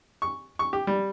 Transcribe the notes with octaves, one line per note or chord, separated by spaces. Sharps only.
C#6
C#6
G4
G3